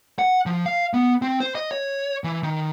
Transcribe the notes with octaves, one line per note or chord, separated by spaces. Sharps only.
F#5
F3
F5
B3
C4
C5
D#5
C#5
E3
D#3